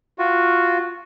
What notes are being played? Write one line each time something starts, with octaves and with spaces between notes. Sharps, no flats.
F4 F#4